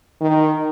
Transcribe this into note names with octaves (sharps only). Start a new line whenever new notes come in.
D#3